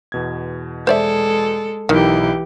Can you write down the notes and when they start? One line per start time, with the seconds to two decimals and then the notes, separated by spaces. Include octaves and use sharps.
0.12 E2 B2 G#6
0.87 G#3 A4 C5 D5 E5
1.89 B1 D#3 E3 D#4 E4 G4